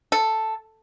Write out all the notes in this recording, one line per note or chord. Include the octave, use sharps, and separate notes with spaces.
A4